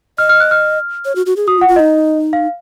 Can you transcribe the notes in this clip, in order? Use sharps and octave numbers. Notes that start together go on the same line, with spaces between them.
D#5 F6
F6
F#6
F6
C#5
F#4
F#4
G#4
F#4 D#6
F4
F#5
F4
D#4 D#5
F5